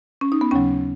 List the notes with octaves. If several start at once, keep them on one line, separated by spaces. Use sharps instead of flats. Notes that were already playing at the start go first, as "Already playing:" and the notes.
C#4
D#4
B3
D#2 C#3 F#3 C#4